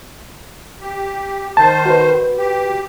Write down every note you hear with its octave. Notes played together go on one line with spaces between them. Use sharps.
G4
D#3 C5 A5
F#4 B4
G4